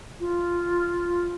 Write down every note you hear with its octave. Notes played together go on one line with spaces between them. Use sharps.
F4